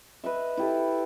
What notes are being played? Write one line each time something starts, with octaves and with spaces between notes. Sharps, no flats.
B4 D#5 E5
E4 G4 A4